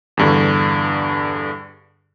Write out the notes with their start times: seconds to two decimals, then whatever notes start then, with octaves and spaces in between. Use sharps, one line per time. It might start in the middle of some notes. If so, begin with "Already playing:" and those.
0.17 E2 G2 D3